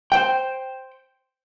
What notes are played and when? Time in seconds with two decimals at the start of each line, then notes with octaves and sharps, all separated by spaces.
0.12 C5 G5